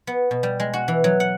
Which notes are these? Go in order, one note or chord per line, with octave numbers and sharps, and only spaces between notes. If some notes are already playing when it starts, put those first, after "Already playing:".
B3
B2
G3
G#3
F#4
E3
F#3
F#5